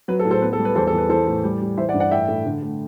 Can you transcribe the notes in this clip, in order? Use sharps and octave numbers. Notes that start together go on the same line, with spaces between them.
F#3 B4
A4
A2
A4 C5
B3 B4
A4
G3
B4
E2 A4 C5
A4
E2
B4
E3 A4 C5
A2
G3
G3
E3 C5 E5
D5 F#5
G2
D5 F#5
A2 E5 G5
A2
D3
A3